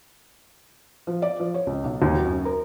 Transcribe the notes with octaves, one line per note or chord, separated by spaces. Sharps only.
F3
D5
F3
C#5
C#2
B1
D#2
F#3
F#2
A#4